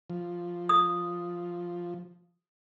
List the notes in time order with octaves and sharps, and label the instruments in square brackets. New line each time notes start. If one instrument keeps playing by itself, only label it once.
[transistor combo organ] F3
[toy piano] D#6